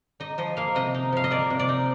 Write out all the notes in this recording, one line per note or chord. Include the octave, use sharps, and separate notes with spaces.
D#4 D#5
F3 D#5
A#3 F5
C3 D#5
D#4
F3 F5
D#5
A#3 D5
C3
D5
D#4